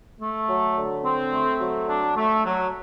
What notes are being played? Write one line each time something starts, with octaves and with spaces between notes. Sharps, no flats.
A3
F#3
D3
C4
A3
F#3
D4
A3
F#3